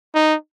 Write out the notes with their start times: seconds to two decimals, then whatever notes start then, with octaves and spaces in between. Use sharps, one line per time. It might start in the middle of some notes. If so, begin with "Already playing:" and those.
0.15 D#4